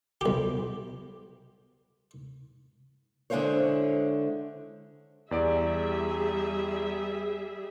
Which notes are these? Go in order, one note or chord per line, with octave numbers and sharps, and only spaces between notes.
B1 G4
D3 G#3 E4 C5 C#5
E2 G3 G#4 D5 E5 D7